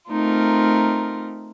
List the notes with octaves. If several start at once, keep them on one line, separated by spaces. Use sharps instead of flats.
A3 C4 D#4 F4 A#4